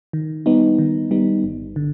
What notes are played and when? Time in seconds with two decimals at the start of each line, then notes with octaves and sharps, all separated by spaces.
0.13 D#3
0.46 G3 B3 D#4
0.79 D#3
1.11 G3 B3 D#4
1.44 G1
1.76 D3